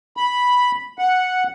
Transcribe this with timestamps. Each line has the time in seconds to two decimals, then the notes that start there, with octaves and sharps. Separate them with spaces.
0.17 B5
0.99 F#5